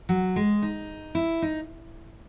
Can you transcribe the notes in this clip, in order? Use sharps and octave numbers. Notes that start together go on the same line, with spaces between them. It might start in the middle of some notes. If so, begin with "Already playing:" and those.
F#3
G#3
D#4
E4
D#4